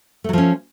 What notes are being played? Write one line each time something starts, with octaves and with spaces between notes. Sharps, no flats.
F3 F#3 A3 C#4